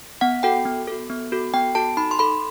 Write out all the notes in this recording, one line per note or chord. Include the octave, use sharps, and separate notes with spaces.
B3 F#5
F#4 A4 G5
B3
F#4 A4
B3
F#4 A4
B3 G5
F#4 A4 A5
D#4 B5
C6
A4 B5